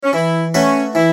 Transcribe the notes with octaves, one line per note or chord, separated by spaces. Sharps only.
C#4
E3 E4
A3 C#4 F#4 B4 E5
E3 E4